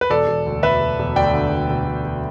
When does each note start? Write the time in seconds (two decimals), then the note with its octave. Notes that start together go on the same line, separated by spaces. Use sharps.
0.01 B4
0.10 E1 A4 D5
0.27 E1
0.46 D2
0.63 E1 B4 E5
0.81 E1
0.99 E1
1.16 D2 D5 G5
1.34 D3
1.52 E1
1.70 E1
1.87 E1
2.05 E1